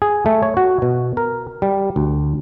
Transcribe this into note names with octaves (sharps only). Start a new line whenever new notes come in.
G#4
A3
C#5
F#4
B2
A#4
G3
D2